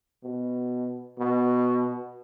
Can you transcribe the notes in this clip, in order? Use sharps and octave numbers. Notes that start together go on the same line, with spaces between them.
B2
B2